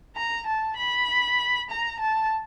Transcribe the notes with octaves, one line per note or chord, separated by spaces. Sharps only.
A#5
A5
B5
A#5
A5